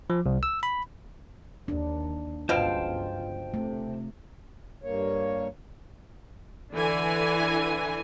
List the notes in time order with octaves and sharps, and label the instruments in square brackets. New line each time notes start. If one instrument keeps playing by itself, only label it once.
[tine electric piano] F3
C2
E6
B5
[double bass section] D#2 [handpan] D4
[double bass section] G1 C#2 [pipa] B2 F5 [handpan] F4 [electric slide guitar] C5 G5 A5
[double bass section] C3 [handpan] A3
[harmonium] G2 A#3 C#5
[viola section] D3 E3 G#5